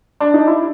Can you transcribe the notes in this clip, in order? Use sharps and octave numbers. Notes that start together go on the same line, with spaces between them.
D4
D#4
E4